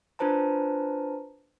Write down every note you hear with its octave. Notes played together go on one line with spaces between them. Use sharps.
D4 F4 B4 C5 A5 A#5